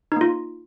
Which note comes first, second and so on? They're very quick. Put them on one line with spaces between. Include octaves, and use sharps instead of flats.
D#4 A#3 F4